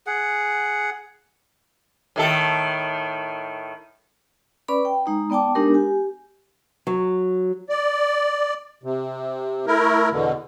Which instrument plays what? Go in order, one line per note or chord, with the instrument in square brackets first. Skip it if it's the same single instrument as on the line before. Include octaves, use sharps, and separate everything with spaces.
[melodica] G#4 F#5
[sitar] A2 D#3 A4
[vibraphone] C#4 B4 D5 B5 D6
G5
G#3 D#4 A#5
B3 D5 G5 A5 D6
G#3 B3 D4 D#4 G4 A#4
G4 G#5
[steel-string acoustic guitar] F#3
[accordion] D5
C3
A3 E4 A#4
E2 B2 D3